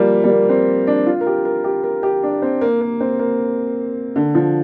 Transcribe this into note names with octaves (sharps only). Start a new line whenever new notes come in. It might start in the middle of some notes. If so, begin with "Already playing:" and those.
Already playing: F3 G3 A#3
G3
A#3
C4
D4
F4
A#4
G4
A#4
G4
A#4
G4
D4
C4
A#3
A#3
C4
A#3
D3
F3